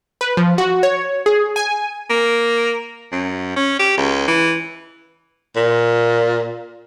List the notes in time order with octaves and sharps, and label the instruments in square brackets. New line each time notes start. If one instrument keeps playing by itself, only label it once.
[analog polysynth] B4
F3
F#4
C#5
G#4
G#5
[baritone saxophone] A#3
F#2
C#4
G4
C#2
E3
[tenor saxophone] A#2